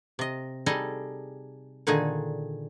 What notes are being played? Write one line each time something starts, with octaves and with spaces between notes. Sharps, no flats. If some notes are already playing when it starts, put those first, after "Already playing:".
C3 D#5
G3 D#4 G#4 A4 D#5
A#2 D3 D#3 D#4 G#4